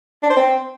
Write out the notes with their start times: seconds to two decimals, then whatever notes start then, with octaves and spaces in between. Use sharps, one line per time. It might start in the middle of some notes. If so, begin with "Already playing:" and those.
0.23 D4
0.30 C5
0.37 C4